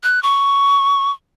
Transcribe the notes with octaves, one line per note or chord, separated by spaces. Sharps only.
F#6
C#6